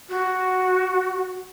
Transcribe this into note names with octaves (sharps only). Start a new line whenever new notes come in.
F#4